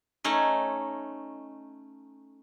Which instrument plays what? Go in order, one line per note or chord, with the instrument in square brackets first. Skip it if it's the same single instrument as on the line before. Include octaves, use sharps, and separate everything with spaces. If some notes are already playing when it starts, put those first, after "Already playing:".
[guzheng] A3 C#4 D#4